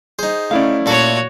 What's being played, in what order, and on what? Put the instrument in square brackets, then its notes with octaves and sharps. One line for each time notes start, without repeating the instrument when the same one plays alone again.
[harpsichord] D#4 C5 [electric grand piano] G#4
[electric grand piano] A3 E4 D5 [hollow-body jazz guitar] C#4 F5
[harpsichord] A#2 A4 [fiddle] F#4 C#5